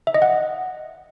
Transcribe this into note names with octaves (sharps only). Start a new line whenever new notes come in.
E5
D#5
F#5